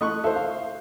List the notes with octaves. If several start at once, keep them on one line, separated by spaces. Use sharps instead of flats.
A3 D#5 C#6 F#6
A4 C5 E5
F5